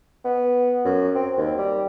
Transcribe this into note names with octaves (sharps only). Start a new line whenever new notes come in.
B3
F#2
C4
D#2
G3